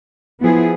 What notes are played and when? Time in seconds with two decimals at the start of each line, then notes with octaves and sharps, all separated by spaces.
0.40 F3 B3 E4 G#4